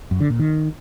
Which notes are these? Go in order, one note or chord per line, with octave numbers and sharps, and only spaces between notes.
F#2
D3
A#2
D#3